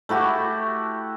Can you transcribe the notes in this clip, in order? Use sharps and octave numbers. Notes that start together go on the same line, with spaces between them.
A3 E4 F#4 G4